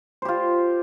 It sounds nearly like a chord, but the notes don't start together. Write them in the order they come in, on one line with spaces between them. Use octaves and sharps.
C5 G4 F4